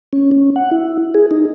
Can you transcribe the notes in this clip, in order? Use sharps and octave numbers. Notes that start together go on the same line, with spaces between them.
C#4
C#4
F#5
E4
G#4
D#4